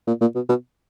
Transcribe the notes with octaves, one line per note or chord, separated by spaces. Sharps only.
A#2
A#2
B2
B2